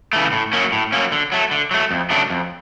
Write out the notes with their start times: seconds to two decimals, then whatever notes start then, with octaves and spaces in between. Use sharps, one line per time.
0.13 C#3 E3 A3
0.32 A2
0.53 F#3 A#3 C#4
0.72 A2
0.92 F#3 A#3 C#4
1.12 D3
1.32 F#3 A3
1.51 D3
1.71 F#3 A3
1.91 F2
2.10 C#3 F#3 A3 D4
2.30 F2